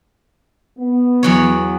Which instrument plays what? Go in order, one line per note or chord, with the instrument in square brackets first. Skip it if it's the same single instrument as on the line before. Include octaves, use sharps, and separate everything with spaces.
[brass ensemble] B3
[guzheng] E2 F#3 C#5